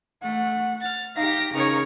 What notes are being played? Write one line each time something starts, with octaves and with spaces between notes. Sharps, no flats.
A3 F#5
F6 A6
D#4 G4 F5 D6 A#6
C#3 D#4 A#4 C#5 C#6